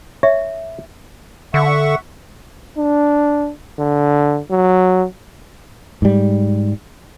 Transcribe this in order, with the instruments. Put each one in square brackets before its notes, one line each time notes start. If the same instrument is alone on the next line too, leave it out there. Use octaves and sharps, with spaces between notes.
[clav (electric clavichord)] C#5 [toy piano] E5
[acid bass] D3 [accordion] E5 F#5 C#6
[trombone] D4
D3
F#3
[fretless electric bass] G#2 G3